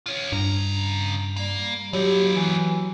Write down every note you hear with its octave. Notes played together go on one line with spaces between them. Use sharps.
F4 C#5
G2 C#3 A#5
G3 A#3
F#3 A#3 E4 G4
E3